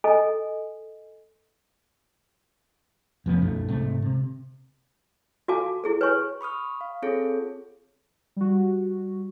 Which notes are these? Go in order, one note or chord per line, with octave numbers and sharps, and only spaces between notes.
A4 D#5 G#5
F1 F3 B3 C#4
B1 F#2 A3
G#2 C3 G#3 A3
C3
F#4 A4 F5 G#5 A5 D6
E4 G#4 A4
B4 C#5 G#5 C#6
B5 C#6 D#6 F6
F5
C4 F4 G#4 A4 C#5
G3 F#4